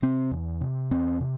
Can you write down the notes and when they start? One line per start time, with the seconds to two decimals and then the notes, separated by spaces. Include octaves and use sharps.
0.02 C3 C4
0.31 E2
0.61 C3
0.91 E2 C4
1.20 C3